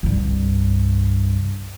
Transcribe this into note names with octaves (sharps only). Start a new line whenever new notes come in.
C2 G2